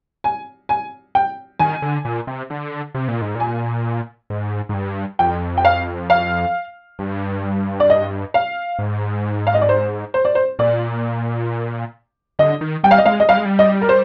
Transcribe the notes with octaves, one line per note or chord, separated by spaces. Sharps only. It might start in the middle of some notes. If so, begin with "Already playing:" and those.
G#5
G#5
G5
D#3 G#5
D3
A#2
C3
D3
C3
A#2
G#2
A#2 G#5
G#2
G#2
G2
F2 G5
G5
F5
F5
G2
D5
D#5
F5
G#2
F5
D#5
D5
C5
C5
D5
C5
A#2 D5
D3 D#5
D#3
G3 G5
F5
D#5
G#3 F5
D#5
G3 F5
G#3
G3
D#5
A#4
C5